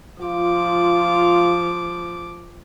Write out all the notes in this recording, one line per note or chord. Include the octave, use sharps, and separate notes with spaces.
F3 F4 D6